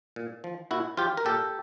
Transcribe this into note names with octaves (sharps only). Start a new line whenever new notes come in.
A#2
F3
A#2 E4 F#4
F3 F4 G4
A#4
A#2 G4 A4